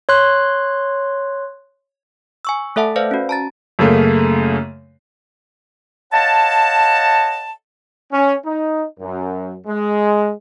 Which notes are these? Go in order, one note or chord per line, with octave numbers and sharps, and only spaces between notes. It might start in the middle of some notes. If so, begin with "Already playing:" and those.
C#5 C6 F#6
G#5 C#6 E6
A3 A4 E5 F#5 A5
B4 C5 D5 F5
C#4 F#4
A5 A#5 A6
F#2 C#3 A3 A#3
C#5 D#5 F5 F#5 A5
C#4
D#4
F#2
G#3